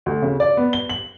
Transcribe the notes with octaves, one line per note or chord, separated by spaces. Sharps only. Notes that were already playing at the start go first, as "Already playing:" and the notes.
D2
C#3
D5
B3
G7
F#7